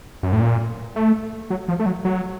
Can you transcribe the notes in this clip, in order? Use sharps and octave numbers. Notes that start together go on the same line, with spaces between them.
F#2
A2
A#2
A3
F#3
F3
A3
F#3
F#3